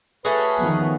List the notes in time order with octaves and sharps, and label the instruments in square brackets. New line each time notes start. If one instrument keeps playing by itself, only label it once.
[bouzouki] A3 C#4 F#4 [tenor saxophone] G#4 [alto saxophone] B4
[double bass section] D#3 F3 B3